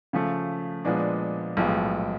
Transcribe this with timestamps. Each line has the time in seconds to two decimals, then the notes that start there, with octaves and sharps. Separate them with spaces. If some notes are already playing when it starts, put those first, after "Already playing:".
0.13 C#3 F3 A3
0.85 A#2 F3 G#3 B3 D4
1.57 B1 A2 F3 G#3 B3